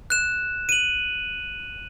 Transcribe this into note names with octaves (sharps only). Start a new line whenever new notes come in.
F#6 E7
D#7 F#7